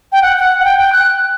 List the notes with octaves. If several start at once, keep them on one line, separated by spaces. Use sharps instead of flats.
G5
F#5
F#5
F#5
G5
G5
F#6